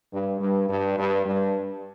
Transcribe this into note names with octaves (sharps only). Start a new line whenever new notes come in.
G2
G2
G2
G2
G2